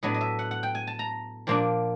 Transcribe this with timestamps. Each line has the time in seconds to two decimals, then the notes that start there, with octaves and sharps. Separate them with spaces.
0.03 A2 F#3 B3 D4 D#5
0.14 D#5
0.21 E5
0.39 F#5
0.51 F#5
0.63 G5
0.75 G#5
0.87 A5
0.99 A#5
1.47 A#2 F3 A#3 D4